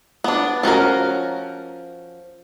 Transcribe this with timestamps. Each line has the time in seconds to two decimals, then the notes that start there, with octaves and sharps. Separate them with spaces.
0.24 B3 D4
0.63 F3 C#4 F#4 A#4